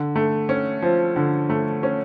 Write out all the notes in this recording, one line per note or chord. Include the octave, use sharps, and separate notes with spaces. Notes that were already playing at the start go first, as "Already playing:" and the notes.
Already playing: D3
A3
C#4
F3
D3
A3
C#4